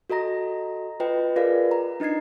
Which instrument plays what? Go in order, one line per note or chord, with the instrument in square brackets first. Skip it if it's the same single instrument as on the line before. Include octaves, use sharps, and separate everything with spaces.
[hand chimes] F#4 A4 D#5 A#5 A#6
F4 B4 D#5 G5
F4 G#4 A#4 B4 D5 F5
A#5
D4 D#4 D#5 G#6 C7